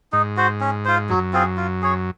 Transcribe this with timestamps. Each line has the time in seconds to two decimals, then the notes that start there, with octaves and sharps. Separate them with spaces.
0.12 G#2 D#4
0.37 F#4 C5
0.61 C#4
0.85 F4 C5
1.09 F#2 F#3
1.33 C4 F4 G#4
1.57 F4
1.82 G#4 C#5